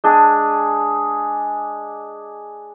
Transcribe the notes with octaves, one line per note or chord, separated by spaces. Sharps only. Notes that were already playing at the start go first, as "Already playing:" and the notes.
G#3 D4 G#4